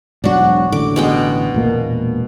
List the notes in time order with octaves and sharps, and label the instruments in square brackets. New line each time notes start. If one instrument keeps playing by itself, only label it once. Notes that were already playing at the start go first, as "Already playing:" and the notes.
[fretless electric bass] E1 G#2 F#3 [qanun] D4 F#4
[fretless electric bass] A1 D3 [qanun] D6
[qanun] B2 G#3 G5
[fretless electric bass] E1 A#2 A#3